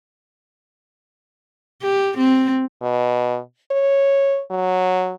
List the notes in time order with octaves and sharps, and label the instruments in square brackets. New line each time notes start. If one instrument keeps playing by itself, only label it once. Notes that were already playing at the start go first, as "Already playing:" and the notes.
[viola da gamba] G4
C4
[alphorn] B2
C#5
F#3